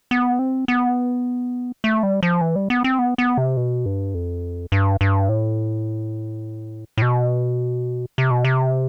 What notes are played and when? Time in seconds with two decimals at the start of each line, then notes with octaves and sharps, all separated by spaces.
0.11 B3
0.39 C4
0.68 B3
1.84 A3
2.03 G3
2.23 F3
2.41 E3
2.56 G3
2.70 B3
2.84 C4
2.99 B3
3.18 B3
3.38 C3
3.57 B2
3.86 G2
4.15 F2
4.72 G2
5.01 G2
5.29 A2
6.98 A2
7.02 B2
8.18 C3
8.31 B2
8.45 C3